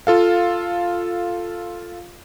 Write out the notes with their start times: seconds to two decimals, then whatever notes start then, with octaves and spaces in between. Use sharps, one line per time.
0.07 F4 A4 F5